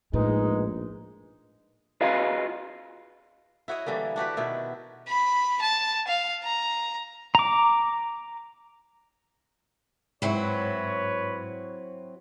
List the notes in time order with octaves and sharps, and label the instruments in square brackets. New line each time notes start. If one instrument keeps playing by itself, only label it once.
[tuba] A#1 [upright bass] A2 [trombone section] G#3 D#4 [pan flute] B4
[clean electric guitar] F4 F#4 G#4 B4 D#5 F5
[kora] E4 F#4 C#5 D#5
D3 E3 G3 A#3
D4 F#4 G4 B4
B2 D#3 E4
[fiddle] B5
A5
F5
A#5
[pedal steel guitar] A#5 D6
[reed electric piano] G#2 [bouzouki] F#3 C4 E4 [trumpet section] B4 C#5